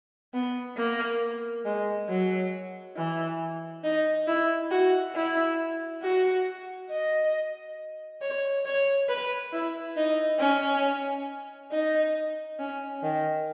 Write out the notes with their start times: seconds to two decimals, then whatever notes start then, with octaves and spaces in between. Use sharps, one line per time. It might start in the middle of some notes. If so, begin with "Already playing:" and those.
0.33 B3
0.77 A#3
1.65 G#3
2.09 F#3
2.96 E3
3.84 D#4
4.27 E4
4.71 F#4
5.15 E4
6.02 F#4
6.90 D#5
8.22 C#5
8.65 C#5
9.09 B4
9.53 E4
9.97 D#4
10.40 C#4
11.71 D#4
12.59 C#4
13.03 D#3